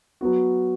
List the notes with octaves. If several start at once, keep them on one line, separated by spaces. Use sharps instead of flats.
F#3 B3 F#4